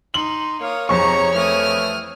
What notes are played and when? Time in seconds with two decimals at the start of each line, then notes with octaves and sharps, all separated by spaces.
0.14 D#4 C6 F#7
0.61 A#3 C#5 F5 D#6
0.89 F2 C3 D#4 G#4 C#5 A#5 C#6 C#7
1.34 E3 G3 A3 D#6 F6